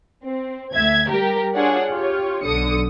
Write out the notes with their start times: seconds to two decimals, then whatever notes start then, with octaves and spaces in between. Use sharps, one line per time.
0.24 C4
0.74 D2 E5 G#6
1.09 G3 G4 A#4
1.54 D4 F4 G#4 C#5 D5 F#5
1.91 F4 G4 C#5
2.43 B1 D3 D#6 C#7